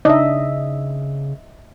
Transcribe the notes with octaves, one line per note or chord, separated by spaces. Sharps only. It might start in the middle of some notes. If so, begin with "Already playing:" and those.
C#3 D4 D#4 D#5 E5